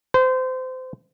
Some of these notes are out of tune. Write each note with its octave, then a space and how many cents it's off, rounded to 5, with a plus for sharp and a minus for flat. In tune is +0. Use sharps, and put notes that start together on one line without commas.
C5 -25